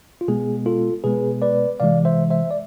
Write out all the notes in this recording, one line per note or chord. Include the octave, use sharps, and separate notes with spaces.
F4
B2 G#3 B3 G#4
F4 A4
B2 G#3 B3 G#4 B4
B4 D5
C3 E3 G#3 D5 F5
C5 E5
C5 E5
D5